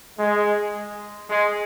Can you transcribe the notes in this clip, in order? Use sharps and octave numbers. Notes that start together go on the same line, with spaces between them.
G#3
G#3